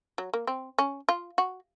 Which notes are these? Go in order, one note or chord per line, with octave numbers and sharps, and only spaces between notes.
F#3
A#3
C4
C#4
F4
F#4